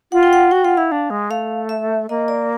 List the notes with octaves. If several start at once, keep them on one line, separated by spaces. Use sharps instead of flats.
F4 F#5
G5
F#5
F#4 G5
F4 F#5
E4 F5
D4
G#3
A3 F5
E5
A#3 D#5
D5